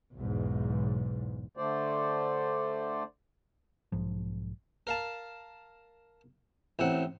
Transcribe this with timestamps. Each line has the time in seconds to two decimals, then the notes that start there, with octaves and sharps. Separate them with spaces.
0.14 B1 E2 G#2
1.57 D3 A3 C5 D5
3.92 B1 G#2 F3
4.87 A#4 F5 A5
6.79 A1 A2 C4 F#5